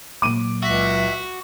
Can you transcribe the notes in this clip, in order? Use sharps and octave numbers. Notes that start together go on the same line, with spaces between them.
A#2 F#3 D6 D#7
C#2 F#4 E5